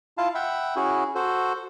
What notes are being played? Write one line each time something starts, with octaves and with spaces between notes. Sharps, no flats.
E4 F4 F5 A5
E5 F#5 G5 B5
C#4 E4 F#4 G#4
F#4 A4 C5